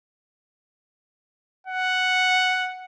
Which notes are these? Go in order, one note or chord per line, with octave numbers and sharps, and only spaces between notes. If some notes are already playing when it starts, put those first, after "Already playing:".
F#5